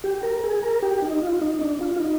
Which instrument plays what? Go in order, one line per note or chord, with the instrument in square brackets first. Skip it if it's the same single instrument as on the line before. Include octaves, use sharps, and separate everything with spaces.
[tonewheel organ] G4
A#4
G#4
A#4
G4
D#4
F4
D#4
D4
F4
F4
D#4